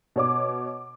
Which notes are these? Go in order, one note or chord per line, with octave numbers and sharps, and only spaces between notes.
B2 C#5 D6